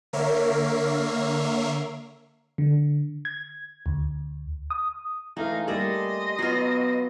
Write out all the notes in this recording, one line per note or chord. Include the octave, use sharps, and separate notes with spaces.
D3 A#3 A#4 C#5 E5 C7
D3
G#6
D2
D#6
E3 G#3 A3 D#4 F5
G3 A3 A#3 G#4 A4 D5 D#5 C6
F#3 B3 F4 C7